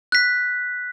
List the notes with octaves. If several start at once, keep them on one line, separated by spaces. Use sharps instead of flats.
F#6 B6